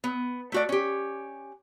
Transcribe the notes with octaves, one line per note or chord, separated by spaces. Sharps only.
B3
A3 F#4 D5
C#4 G4